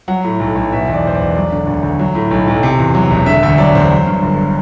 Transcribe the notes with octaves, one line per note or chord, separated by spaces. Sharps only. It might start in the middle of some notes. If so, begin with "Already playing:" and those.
F#3 F#5
A2
B1
B1
B2 E5
E2 D5
E1 C5
D5
E1
F#3 D5
D3
D2
D2
F#3
A2
B1
B1
C3
E2
F#3
E1
D3 E5
D2 E5
F#3 D5
E1 C5
F#3
G2
G1